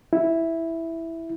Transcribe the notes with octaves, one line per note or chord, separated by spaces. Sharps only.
E4